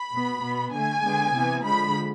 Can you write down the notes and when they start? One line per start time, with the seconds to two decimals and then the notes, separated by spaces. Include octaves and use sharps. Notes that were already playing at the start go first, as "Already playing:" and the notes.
Already playing: B5
0.12 B2 B3
0.42 B2 B3
0.73 D3 A3 G#5
1.04 D3 G#3 B3
1.34 C3 E3 B3
1.65 D3 F3 G#3 B5